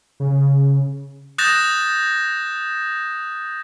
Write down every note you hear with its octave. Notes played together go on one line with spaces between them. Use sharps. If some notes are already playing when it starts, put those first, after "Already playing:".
C#3
D#6 F#6 G6 A6 A#6 E7